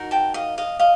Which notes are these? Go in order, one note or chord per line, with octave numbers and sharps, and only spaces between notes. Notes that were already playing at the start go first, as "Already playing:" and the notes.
Already playing: D#4 F#4 A#4
G5 A5
D#5 F5
D#5 F5
D#5 F5